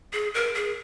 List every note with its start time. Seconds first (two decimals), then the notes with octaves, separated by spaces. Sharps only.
0.13 G#4
0.34 A#4
0.55 G#4